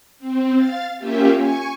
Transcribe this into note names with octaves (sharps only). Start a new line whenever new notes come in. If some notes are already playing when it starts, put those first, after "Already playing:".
C4
F5 A6
A#3 C#4 F4 G4 E5
G#5 C#6